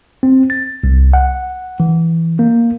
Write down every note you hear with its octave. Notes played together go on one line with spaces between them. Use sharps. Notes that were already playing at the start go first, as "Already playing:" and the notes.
C4
A6
C2
F#5
E3
A#3